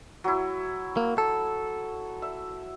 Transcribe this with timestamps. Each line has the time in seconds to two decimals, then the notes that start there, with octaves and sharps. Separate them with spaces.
0.24 F#3 E4
0.97 A#3
1.18 A4
2.22 E5